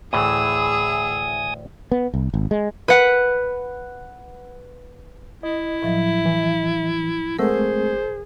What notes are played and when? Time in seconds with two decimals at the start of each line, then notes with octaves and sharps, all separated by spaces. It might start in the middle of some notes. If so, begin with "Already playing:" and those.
0.13 D2 A2 E3 G#4 G#5 D#6 E6
1.92 B3
2.14 C2
2.34 G#1
2.51 G#3
2.88 B4 F#5
5.43 E4 D#5
5.82 A2 F3 F#3 E5
6.26 E3
7.39 G#3 A3 C4 G#4 A#4 C5 F#5 E6